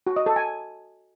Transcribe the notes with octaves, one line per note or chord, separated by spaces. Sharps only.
F#4
D#5
A4
G#5